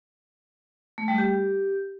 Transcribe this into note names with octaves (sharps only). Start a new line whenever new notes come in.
A3
G3
G4